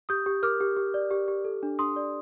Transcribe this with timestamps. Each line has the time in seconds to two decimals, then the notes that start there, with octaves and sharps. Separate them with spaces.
0.09 G4 D#6 G6
0.26 G4
0.43 A#4 D6 F6
0.60 G4
0.77 G4
0.94 D5
1.11 G4
1.28 G4
1.45 A4
1.63 D4
1.79 D4 C6 D#6
1.96 D5